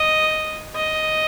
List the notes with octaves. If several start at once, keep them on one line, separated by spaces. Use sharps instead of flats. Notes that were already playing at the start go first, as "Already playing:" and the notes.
Already playing: D#5
D#5